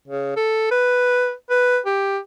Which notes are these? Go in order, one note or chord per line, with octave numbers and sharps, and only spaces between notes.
C#3
A4
B4
B4
G4